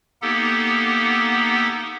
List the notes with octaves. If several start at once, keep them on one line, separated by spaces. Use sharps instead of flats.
A#3 B3 D#4 G4 A4 F#5